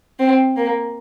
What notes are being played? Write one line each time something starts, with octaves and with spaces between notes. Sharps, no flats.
C4
A#3